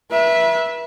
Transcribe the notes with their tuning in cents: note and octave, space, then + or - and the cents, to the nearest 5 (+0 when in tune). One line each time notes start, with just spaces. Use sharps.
B4 -35 E5 +0